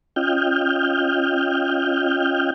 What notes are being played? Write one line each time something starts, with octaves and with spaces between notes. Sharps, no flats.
C#4 F4 D#5 G5 F6 G6